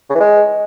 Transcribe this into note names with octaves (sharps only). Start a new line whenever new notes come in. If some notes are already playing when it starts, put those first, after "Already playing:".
C#3
E3
G#3